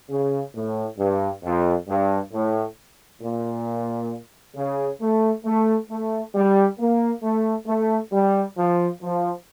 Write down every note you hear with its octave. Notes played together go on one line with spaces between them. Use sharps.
C#3
A2
G2
F2
G2
A2
A#2
C#3
A3
A3
A3
G3
A#3
A3
A3
G3
F3
F3